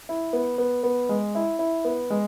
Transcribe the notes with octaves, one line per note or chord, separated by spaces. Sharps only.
E4
B3
B3
B3
G#3
E4
E4
B3
G#3